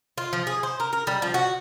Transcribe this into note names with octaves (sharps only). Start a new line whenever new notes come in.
F4
F3
G#4
C5
A#4
A#4
G3
F3
F#4